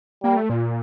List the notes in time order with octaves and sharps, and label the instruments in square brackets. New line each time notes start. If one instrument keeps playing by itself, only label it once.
[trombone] G3 [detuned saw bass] A#3
[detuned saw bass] A3
A#2